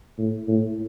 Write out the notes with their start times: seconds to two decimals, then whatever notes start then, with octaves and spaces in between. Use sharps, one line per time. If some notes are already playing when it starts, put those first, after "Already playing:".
0.18 A2
0.48 A2